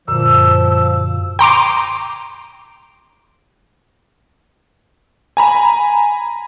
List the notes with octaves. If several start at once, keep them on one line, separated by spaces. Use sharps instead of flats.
F#2 A#2 D3 F3 E6
G5 A#5 C6 D6
G#5 A#5 B5